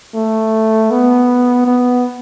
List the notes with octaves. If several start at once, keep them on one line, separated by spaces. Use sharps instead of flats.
A3
B3
B3